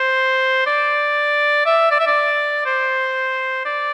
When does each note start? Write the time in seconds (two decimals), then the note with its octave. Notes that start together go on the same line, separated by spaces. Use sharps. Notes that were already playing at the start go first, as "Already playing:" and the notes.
Already playing: C5
0.66 D5
1.66 E5
1.91 D5
1.99 E5
2.07 D5
2.66 C5
3.65 D5